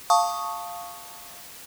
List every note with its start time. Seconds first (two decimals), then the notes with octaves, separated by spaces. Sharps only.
0.10 F5 A5 C#6 D#6